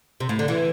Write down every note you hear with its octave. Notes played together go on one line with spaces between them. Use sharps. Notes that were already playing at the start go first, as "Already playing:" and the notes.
C3
A2
D3
E3